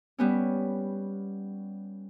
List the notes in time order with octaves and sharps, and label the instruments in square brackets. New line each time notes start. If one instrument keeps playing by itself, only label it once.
[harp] G3 B3 C#4